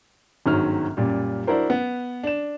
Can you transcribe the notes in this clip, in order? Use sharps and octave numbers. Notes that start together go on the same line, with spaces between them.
G1 G#2 D#3 F#3 C#4 F6
F#2 A#2 G3
D4 E4 F#4 A#4 C5
B3
D4 E7